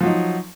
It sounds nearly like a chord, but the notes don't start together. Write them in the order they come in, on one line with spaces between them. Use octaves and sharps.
F3 F#3 D#4